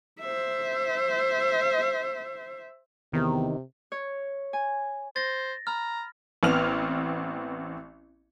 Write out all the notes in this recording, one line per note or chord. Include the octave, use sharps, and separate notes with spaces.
C5 E5
E2 C3 D#3
C#5
G#5
C5 A6 A#6
A#5 B5 F6
A1 B3 C4 F6 F7